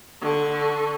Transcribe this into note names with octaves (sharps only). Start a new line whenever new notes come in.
D3 C#6